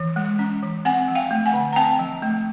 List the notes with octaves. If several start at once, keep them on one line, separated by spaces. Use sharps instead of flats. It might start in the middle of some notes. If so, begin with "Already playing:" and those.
Already playing: E3
G#3
C#4
E3
C4 F#5 G#5
F3
F5 G5
A3
F#5 G#5
D3
A#5
C4 G5 A5
F3
A3